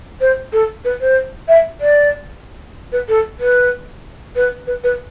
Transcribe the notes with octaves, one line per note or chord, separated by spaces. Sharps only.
C5
A4
B4
C5
E5
D5
B4
A4
B4
B4
B4
B4